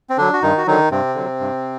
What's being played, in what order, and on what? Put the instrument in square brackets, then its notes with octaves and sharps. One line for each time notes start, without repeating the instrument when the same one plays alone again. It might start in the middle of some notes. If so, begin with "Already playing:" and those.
[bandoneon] C4
D3 F#3 D4
F#4
G2 D#3 D#4
F#4
D3 D#3 F#3 D#4
G2 C3 C4
D3 F#3
G2